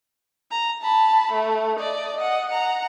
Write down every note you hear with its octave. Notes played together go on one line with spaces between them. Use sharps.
A#5
A5 B5
A3
D5 D#5
D#5 F#5
F#5 A#5